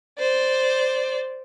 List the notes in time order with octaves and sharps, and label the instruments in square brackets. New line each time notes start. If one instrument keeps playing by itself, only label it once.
[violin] C5 D5